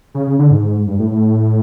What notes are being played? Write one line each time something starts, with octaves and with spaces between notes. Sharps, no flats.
C#3
C#3
D3
G#2
G2
A2
A2